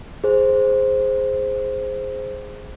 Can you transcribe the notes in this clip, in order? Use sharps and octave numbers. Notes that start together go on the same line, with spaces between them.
G#4 C5